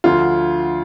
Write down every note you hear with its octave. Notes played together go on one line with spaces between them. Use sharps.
D2 D3 F3 F4